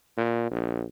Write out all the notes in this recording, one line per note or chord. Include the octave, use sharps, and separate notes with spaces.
A#2
A#1